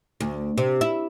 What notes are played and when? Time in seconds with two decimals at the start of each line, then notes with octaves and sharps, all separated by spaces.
0.20 D2
0.58 C3
0.81 E4